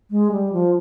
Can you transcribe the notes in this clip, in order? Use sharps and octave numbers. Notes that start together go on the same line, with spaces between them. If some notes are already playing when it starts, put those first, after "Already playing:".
G#3
G3
F3